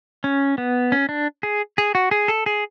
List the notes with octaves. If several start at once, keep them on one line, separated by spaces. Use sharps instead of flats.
C#4
B3
C#4
D4
G#4
G#4
F#4
G#4
A4
G#4